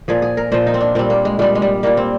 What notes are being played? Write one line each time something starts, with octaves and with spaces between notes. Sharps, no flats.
A#2 F3 G#4
G#4
A#4
A#2 F3 C5
D#4
C4
D4
A#2 G3 C4
A#3
G#3
A#2 G3 G#3
G#3
G3
A#2 G3 A#3
C4